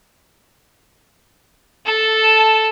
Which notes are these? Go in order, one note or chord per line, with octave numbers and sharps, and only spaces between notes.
A4 A5